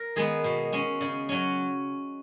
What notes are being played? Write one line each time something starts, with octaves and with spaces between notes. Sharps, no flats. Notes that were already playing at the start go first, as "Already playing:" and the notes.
Already playing: A#4
D#3 G#3 B3 G#4
B2
G#3 C#4
C#3
F#3 C#4